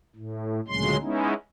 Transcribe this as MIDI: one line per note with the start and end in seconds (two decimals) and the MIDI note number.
0.16 0.60 45
0.68 0.97 38
0.68 0.97 46
0.68 0.97 49
0.68 0.97 54
0.68 0.97 56
0.68 0.97 84
1.02 1.34 56
1.02 1.34 59
1.02 1.34 61
1.02 1.34 63
1.02 1.34 64